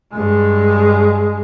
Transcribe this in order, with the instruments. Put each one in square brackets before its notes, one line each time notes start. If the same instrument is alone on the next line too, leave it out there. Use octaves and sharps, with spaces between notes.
[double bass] G2 G#3